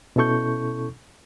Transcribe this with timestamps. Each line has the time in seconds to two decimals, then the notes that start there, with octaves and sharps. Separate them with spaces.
0.16 B2 C#4 E4 A4 C#6 G6